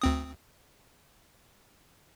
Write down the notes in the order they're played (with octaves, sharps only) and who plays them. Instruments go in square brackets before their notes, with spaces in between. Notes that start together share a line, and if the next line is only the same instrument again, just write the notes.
[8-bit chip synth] D2 C4 D#6